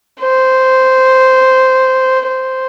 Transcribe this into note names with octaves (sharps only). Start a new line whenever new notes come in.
C5
C5